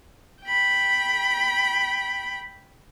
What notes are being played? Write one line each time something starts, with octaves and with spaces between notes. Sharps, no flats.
G5 B5